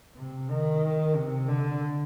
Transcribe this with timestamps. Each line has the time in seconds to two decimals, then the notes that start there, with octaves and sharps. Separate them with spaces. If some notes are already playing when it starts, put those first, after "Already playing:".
0.16 C3
0.50 D#3
1.15 C3
1.48 D3